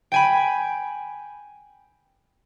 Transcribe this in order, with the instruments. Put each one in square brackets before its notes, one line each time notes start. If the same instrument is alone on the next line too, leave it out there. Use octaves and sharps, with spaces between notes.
[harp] G5 G#5 B5